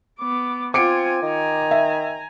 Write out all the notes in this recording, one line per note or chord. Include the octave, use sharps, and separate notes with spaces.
B3 D6
C4 F4 G#5 D6 C#7 D7
D#3 G#5 A#5
E5